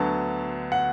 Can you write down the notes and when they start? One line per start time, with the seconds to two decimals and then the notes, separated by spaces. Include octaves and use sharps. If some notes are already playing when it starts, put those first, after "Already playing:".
Already playing: D2 D3 F#3 B3 A5
0.72 F#5